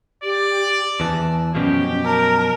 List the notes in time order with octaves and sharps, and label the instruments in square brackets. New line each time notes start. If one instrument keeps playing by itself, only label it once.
[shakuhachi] G4 [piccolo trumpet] D5
[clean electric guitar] E2 E3 [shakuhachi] A5
[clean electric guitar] F#2 B2 F3 [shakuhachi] C#4 [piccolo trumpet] G4
[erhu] A#4 [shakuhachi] A5